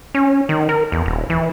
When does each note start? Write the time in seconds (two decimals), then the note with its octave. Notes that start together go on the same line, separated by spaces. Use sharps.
0.15 C#4
0.49 D#3
0.69 A#4
0.92 E2
1.06 D#1
1.30 E3